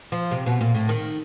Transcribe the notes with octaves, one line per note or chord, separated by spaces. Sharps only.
F3
C3
B2
A#2
A2
D#3